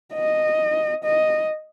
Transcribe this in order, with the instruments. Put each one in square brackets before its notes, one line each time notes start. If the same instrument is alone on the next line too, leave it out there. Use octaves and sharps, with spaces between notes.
[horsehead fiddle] D#5
D#5